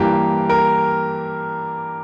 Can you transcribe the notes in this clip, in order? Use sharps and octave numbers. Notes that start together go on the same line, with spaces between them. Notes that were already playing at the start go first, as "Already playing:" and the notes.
Already playing: G2 E3 A#3 G4
A#4